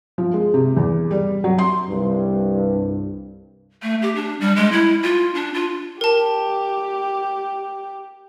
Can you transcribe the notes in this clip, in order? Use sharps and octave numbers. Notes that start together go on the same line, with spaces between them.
F3
G#3
C3
E2
G3
F#3
C6
C2 G2
A3
G4
D4
G3
G#3
E4
F4
D4
F4
G4 A#4 A5